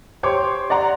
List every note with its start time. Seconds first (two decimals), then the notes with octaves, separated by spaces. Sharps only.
0.23 G4 C5 C#5 C6 D6
0.70 D5 F#5 A#5 C6